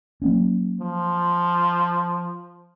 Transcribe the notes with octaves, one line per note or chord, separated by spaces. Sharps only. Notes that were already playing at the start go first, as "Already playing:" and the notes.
F#3 A#3 C#4
F3